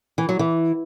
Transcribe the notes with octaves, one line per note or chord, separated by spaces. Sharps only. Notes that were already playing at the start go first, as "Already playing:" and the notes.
E3
F#3
E3